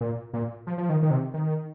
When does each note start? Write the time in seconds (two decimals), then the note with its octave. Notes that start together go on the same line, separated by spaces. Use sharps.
0.01 A#2
0.34 A#2
0.67 F3
0.78 F3
0.89 D#3
1.03 D#3
1.11 C3
1.34 D#3